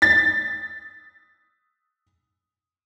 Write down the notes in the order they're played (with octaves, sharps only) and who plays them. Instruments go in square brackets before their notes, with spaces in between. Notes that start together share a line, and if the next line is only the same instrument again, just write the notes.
[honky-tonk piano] A6 B6